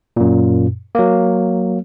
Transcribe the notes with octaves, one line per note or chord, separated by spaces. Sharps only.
F#2 A#2
F#3 A#3